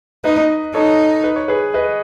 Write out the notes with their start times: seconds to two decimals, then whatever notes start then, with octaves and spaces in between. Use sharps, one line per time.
0.24 D#4 B4 D#5
0.74 D#4 A4 C#5
1.24 B4
1.36 C#5
1.48 G#4 B4
1.74 B4 D#5